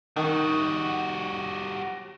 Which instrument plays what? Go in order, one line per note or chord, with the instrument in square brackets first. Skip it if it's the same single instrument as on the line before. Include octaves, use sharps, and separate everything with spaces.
[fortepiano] D#3 [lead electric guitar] G3 F#4